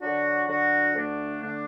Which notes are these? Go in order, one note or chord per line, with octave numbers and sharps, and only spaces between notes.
D3 F#3 D4 F#4
D3 F#3 D4 F#4
D2 D3 A3 D4
D3 A3 D4